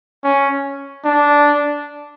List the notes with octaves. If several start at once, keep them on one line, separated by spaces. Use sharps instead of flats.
C#4
D4